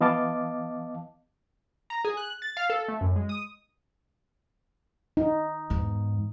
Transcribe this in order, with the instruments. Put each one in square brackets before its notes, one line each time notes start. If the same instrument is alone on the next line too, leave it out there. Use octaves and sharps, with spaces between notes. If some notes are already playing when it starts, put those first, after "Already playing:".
[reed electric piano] E3 B3 D#5 F5 A5 D6
[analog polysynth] A#5
G#4
F#6
A6
F5
A4
A3
F#2
G#3
D#6
[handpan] D#4
[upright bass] E2 G#2